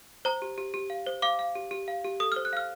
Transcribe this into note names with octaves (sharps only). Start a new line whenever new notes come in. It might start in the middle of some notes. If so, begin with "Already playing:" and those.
C5 A#5
G4
G4
G4
F5
C5
F5 D6
F5
G4
G4
F5
G4
A4 D#6
F6
C5
F#6
F5 F6